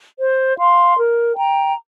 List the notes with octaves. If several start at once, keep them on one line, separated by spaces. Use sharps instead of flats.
C5
F5 C6
A#4
G5 A#5